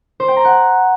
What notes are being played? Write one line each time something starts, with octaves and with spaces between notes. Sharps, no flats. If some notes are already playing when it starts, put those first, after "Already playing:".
C5
G5
A#5
F#5